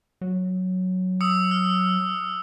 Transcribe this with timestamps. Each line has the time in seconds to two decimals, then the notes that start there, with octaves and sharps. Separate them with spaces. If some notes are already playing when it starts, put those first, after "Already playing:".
0.21 F#3
1.21 D#6 E6 C#7
1.51 F6